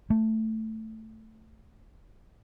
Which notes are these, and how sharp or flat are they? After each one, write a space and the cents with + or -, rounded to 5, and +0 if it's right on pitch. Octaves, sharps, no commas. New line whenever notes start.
A3 +5